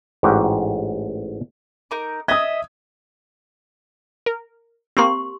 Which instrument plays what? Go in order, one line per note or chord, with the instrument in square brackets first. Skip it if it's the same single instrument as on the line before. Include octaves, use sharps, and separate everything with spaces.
[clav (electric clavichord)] A1 G#2 F#4 G4
[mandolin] D#4 A#4 D6
[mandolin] D#5 E5 [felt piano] D#6 G#6
[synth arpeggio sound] A#4
[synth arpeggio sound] A#3 C4 [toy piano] G4 C6 C#6